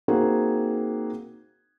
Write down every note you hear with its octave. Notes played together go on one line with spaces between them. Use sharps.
A#3 C4 D#4 F#4 G#4